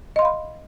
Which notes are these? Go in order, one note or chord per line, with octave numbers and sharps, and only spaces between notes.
D#5 F5 B5 C6